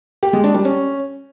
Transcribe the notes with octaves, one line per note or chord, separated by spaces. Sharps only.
G4
G#3
D4
G3
C#4